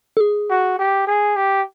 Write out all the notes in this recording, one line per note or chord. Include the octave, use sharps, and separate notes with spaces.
A4
G#4
F#4
G4
G#4
G4